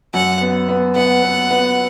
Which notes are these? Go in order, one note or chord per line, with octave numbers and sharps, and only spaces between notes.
F#2 F#5
B3
B3
B3 F#5
B3
B3